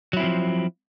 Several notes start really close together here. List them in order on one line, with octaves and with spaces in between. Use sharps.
F#3 E4 C4 F3